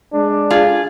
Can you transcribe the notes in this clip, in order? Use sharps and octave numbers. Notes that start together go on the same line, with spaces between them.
G#3 D4
F4 G#4